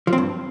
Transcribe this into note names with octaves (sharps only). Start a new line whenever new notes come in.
F3
C4
G2